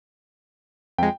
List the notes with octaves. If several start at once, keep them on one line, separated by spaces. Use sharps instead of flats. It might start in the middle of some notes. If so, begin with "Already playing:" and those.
F2 G#3 G5